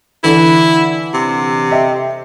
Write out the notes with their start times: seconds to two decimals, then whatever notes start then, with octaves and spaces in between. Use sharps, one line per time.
0.24 D3 E3 E4 A4
1.14 C3
1.71 D#5 E5 G5